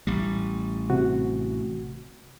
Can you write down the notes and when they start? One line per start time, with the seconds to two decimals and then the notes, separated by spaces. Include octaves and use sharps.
0.07 A1 G3
0.90 C3 F#4